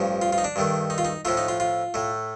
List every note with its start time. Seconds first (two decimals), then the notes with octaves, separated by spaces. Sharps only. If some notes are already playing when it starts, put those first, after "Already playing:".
Already playing: A1 G2 F3
0.22 F4
0.33 F4
0.38 D#4
0.44 D4
0.56 G2 D#3 A3
0.90 D#4
0.98 F4
1.05 D#4
1.25 A2 F3 A3 F4
1.37 D#4
1.48 F4
1.60 F4
1.94 A2 A3